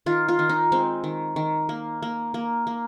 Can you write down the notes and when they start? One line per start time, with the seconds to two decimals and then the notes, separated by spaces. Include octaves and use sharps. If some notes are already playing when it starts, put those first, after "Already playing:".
0.06 D#3 F4
0.28 F4
0.39 D#3
0.49 D#4
0.72 G#3 C4
1.04 D#3
1.36 D#3
1.69 A#3
2.02 A#3
2.34 A#3
2.67 A#3